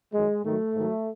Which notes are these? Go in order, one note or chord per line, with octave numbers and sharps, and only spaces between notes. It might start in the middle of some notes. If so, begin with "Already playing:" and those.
F#2 D#3 F#3 G#3
G#2 D#3 F#3 A3
G#2 D#3 F#3